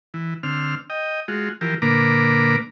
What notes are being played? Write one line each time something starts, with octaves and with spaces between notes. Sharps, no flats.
E3
D3 C4 F6
D#5 G5
G#3 F4 F#4
E3 F3 G4 A#4
A#2 D3 A#3 B4 A#5 D6